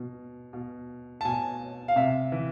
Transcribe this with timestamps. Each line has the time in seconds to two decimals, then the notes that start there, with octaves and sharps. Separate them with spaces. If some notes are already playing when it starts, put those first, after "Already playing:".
Already playing: B2
0.53 B2
1.21 A5
1.25 B2 G#5
1.88 F5
1.96 C3 E5
2.32 E3